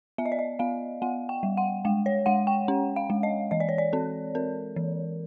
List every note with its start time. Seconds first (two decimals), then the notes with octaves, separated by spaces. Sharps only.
0.18 B3 E5
0.26 D#5
0.32 D5
0.39 D#5
0.59 B3 F5
1.02 B3 F#5
1.29 G5
1.43 G3
1.57 F#5
1.85 G#3 G5
2.06 C#5
2.26 G#3 F#5
2.47 G5
2.68 C#4
2.96 F5
3.10 G#3
3.23 D#5
3.51 E3 D#5
3.60 D5
3.69 C#5
3.78 D5
3.93 C4 A4
4.35 C4 A#4
4.76 E3